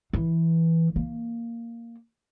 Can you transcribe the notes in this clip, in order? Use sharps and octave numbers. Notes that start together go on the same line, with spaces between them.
E3
A#3